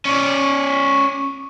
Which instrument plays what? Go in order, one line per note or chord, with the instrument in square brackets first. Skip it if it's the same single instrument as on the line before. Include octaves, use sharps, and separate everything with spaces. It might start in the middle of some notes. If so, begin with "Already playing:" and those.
[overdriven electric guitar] C#4 D5